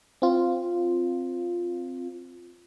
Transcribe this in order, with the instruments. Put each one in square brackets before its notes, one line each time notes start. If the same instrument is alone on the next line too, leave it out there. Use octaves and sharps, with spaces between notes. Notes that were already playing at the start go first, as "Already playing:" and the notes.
[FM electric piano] C4 F4